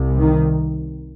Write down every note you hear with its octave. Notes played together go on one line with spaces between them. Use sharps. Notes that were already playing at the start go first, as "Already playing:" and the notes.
Already playing: C2 C3
D#3